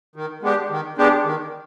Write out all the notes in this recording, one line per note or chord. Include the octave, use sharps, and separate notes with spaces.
D#3
G#3 B3 D4 G4
D#3
G#3 B3 D4 G4
D#3